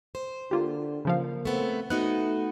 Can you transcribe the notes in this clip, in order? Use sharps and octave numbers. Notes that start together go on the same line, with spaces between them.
C5
D3 A#3 F4 G4
C#3 F3 A#3 F5
A3 B3 C4
A3 B3 D#4 F#4 F#6